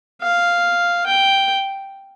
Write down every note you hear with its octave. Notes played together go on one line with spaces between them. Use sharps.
F5
G5